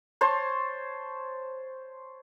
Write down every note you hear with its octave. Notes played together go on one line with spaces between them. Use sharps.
C5 C#5 A5 C6